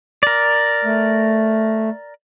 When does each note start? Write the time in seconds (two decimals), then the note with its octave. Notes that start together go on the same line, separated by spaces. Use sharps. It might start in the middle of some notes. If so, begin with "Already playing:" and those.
0.23 A#4 D5
0.85 A3